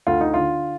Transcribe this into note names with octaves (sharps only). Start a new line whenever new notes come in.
D2 F4
D#4
D3 F4